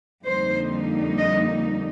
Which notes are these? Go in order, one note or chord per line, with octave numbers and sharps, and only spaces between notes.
F2 D3 G3 A#3 D#4 C5
D#5